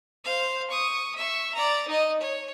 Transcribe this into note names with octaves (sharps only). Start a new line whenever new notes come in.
C5 F5
C#6 D#6
E5 C#6
D5 A#5
D#4 D#5
C#5